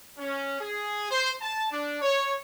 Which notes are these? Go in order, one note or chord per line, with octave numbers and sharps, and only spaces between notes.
C#4
G#4
C5
A5
D4
C#5